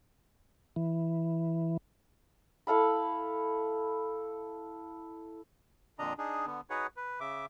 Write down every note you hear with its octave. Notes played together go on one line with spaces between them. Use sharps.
E3
E4 A4 F5 B5
F2 A#2 D3 D4 D#5 A#5
D4 D#4 G#4
D3 B3
D#4 F#4 G#4 B4 C#5 F#5
B4
C#3 E5 D6